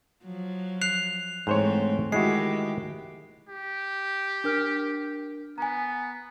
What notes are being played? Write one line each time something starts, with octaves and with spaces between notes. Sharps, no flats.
F3 F#3
F#6 C7 F7
G#2 E3 A3 C4 C5 C#5
D#3 G#3 E4 F#4 G4 C7
G4
D4 A#4 F6
B3 G#5 A#5